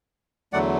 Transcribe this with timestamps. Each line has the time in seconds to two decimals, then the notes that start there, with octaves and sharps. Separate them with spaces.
0.53 E2 D3 F#3 A3 D5 F#5